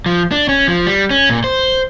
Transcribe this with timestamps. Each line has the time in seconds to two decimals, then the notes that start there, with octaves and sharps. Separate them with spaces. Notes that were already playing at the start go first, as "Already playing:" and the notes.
0.06 F3
0.31 D4
0.49 C#4
0.68 F3
0.86 G3
1.11 C#4
1.30 A#2
1.44 C5